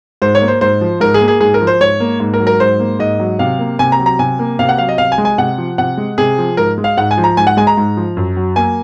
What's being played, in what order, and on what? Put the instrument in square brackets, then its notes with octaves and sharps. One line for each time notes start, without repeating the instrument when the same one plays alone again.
[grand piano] G#2 C5
C#5
A#3
C5
G#2 C5
F3
G#2 A#4
G#4
A#3
G#4
G#2 G#4
A#4
F3
C5
G#2 C#5
A#3
G#2
A#4
F#3
A#4
G#2 C5
A#3
G#2 D#5
F#3
C3 F5
A#3
C3 G#5
A#5
F#3
A#5
C3 G#5
A#3
C3 F5
F#5
F#3 F5
D#5
C3 F5
G#5
G#3
G#5
C3 F#5
F3
C3 F#5
G#3
C3 G#4
F3
G#2 A#4
G#3
F5
G#2 F#5
G#5
F3
A#5
G#2 G#5
F#5
G#3 G#5
A#5
G#2
F3
F#2
F#3
A#3 G#5